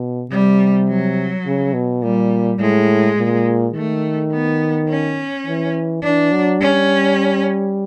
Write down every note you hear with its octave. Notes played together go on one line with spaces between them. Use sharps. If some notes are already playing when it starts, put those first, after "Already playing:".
Already playing: B2
C3 G3
F#3
C#3
B2
A#2 G3
A2 G#3
A#2
D#3 A3
B3
C#4
E3
E3 D4
F#3
G3 C#4